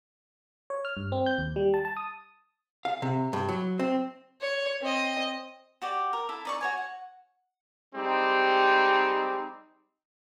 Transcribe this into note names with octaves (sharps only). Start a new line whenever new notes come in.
C#5
F6
G2
C4
G6
D#2
G3
A5
A5
D#6
F5
C3
G2
F#3
C4
C#5
C4 D#5
F#4 G4 D5
A#4
E4 A4
D#4 D5 C#6
F#4 C#5 G#5
F#5
G3 G#3 C4 D#4 G4